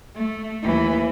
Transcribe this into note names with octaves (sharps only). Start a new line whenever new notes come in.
A3
D#2 E3